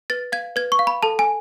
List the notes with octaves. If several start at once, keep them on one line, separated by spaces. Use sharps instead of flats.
B4 A6
F5 G#6
B4 G#6
C#6
F5
B5
A4 A5
G#5